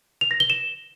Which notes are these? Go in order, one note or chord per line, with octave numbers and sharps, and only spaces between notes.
F7
A#6
G7
E7